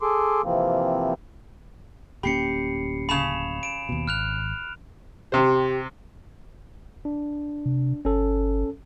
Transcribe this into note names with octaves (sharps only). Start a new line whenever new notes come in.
G#4 A4 C6 D6
C3 E3 F3 A#3 C4
D1 A#3 C#4 G4 B5 C7 C#7
C#3 A5 B5 E7 F7
D7 E7
D#2 B2
G#1 F6 F#6 F7
C3 G4 C5
D4
C3
G1 C#4 A4